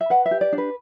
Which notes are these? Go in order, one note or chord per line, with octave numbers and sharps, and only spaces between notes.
E5
B4 F#5
E5
G4
D5
D4
B4